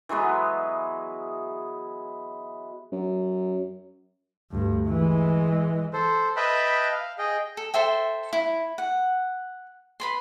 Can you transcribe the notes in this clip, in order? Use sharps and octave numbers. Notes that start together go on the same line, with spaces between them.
E3 F#3 G#3 B3
F#2
D2 G2
E3 G#3
A4 C5
B4 D#5 E5 G5 A5 B5
F5
G#4 D#5 G5
A4
A4 C5 E5 G5
E4
F#5
B4 B5 C6